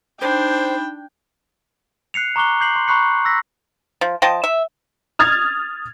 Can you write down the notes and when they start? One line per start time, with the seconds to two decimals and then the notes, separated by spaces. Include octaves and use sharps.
0.21 D4 D#4 C5 G5 B5
2.14 F#6 C7 C#7 F7
2.36 A#5 C#6 D6 F#6 G7
2.60 D6 G6 C7 F#7
2.76 C6
2.87 A#5 B5 C#6 F#6 C7 C#7
3.25 E6 A#6 B6
4.01 F3
4.22 F3 D#5 G5 A5
4.44 E5
5.19 D#6 F6 G#6 A6